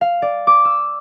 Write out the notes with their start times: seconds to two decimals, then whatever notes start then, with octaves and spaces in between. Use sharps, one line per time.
0.01 F5
0.22 D5
0.47 D6
0.65 E6